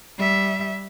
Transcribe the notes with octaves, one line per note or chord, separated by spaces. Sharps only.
G3 E5